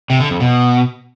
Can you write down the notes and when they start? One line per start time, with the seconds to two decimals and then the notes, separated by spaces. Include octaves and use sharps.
0.10 C3
0.20 D3
0.30 F2
0.40 B2